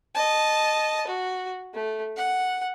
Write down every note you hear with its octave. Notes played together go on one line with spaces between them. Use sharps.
D#5 A5
F#4
A3
F#5